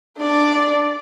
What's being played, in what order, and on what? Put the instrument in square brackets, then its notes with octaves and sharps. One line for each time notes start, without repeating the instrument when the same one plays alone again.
[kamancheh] D4 D5